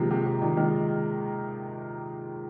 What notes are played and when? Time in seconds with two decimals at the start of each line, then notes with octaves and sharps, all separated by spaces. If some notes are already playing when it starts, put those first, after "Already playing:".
Already playing: C3 D#3 F3 G#3 A#3
0.11 C3
0.26 C3
0.42 A#2 D#3
0.57 D#3 G#3